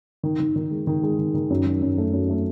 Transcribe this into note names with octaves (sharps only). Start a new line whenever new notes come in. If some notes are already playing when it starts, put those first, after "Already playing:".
D#3
D#3
D#3
G#3
D#3
G#3
D#3
D#3
F#2
F#3
F#2
A3
F#2
A3